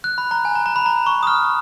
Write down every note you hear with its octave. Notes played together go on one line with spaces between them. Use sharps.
F#6
B5
A#5
G#5
A#5
A#5
B5
A#5
C#6
D#6
F6